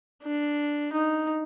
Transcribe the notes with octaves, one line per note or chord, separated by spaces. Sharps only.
D4
D#4